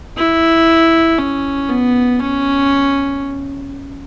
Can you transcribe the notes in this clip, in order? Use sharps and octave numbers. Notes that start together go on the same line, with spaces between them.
E4
C#4
B3
C#4